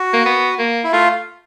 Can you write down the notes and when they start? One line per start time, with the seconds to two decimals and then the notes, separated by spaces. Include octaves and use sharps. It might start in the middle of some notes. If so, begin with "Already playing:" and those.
Already playing: F#4
0.13 A#3
0.26 B3
0.59 A#3
0.84 E4
0.93 A3 F4